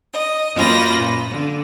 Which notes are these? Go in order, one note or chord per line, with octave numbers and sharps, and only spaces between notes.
D#5
F#2 A#3 F4 B4 A#6
A#2
D3